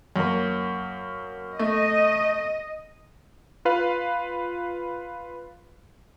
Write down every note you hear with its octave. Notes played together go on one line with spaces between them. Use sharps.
F#2 A#3
A3 D#5
F4 B4 F5